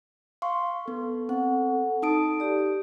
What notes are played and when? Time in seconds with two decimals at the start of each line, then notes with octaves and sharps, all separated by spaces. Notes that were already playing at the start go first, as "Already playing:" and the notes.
0.42 F5 C6 C#6
0.88 B3 A4
1.29 C4 F#5
2.02 D#4 A5 D#6 D7
2.40 G4 D5